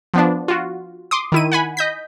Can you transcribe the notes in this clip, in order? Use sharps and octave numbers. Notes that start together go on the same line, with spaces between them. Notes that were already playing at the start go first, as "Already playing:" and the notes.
F3 B3 D4
F4 F#4
C6 D6 D#6
D#3 E4 D#7
F#5 G#5 B5
D#5 G6 B6